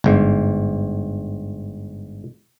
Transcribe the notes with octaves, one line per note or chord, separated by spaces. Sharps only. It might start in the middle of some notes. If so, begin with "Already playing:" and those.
G1 G#2